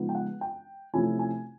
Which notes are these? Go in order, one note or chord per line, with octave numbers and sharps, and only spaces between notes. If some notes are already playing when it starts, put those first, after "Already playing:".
Already playing: C#3 F3 G#3 B3 D#4
G5
F#5
G5
C3 F3 A3 C#4 E4 G#5
G#5